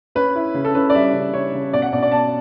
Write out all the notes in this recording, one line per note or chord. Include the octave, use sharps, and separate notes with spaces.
C#4 B4
E4
C#3
A4
C#4 B4
D5
G3 E5
C#3
C#3 C#5
C#3
B2 D5
F#5
B2 D5
D5
B2 A5